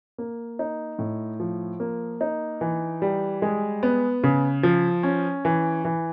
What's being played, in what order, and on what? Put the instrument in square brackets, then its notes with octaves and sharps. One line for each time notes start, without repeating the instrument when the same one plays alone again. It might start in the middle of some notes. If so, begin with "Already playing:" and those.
[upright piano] A#3
D#4
A2
F3
A#3
D#4
E3
G3
G#3
B3
C#3
F3
C#4
E3
E3